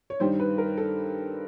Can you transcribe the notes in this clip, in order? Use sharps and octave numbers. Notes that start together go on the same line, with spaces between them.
C#5
G2 D#3 G3 C5
B4
A#4
A4